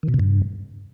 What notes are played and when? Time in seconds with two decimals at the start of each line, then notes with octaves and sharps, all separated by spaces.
0.03 D#3
0.09 B2
0.14 C3
0.19 G2